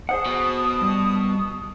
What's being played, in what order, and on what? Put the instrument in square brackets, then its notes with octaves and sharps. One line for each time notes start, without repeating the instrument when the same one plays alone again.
[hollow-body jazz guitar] G#4 C5 F#5 [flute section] A5 D#6
[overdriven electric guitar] B2
[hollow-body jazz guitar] G2